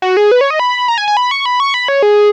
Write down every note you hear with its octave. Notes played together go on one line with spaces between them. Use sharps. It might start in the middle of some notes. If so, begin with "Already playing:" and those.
F#4
G#4
B4
C#5
D#5
B5
A#5
G#5
G#5
B5
C#6
B5
C#6
B5
C#5
G#4